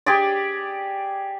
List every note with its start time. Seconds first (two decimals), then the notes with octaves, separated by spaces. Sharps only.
0.06 G4 G#4 D5